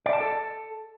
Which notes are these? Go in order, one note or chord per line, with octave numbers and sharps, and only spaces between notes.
D5
A5
A4